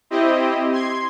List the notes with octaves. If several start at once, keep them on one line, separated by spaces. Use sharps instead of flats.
C4 E4 G4 D#5
C6 G#6